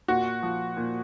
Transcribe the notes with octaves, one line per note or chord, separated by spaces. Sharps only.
A#2 F#4
F3
A#2